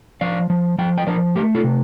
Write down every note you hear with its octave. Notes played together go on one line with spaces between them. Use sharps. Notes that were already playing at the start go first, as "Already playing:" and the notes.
F3 D5 F5
F3
F3 G5
D#5 G5
F3 A#4 D5
A3 G4 A#4
F4 A4
C3